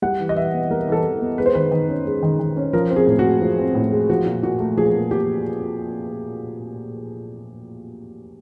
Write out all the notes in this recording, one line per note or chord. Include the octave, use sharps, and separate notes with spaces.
G3 F#5
E3
D#5
E3 E5
B3
G3 A#4
E3 A4
E3
B3
G#3 B4
C5
D#3 B4
D#3
C#4
G#3
D#3
D#3
C#4
F3 A#4
C4
G#4
A2
F#4
G#3
F3
C4
A2
G#3
F3 F#4
A#2
A#2 F#4
A3
F3 G#4
A#2
A#2 G4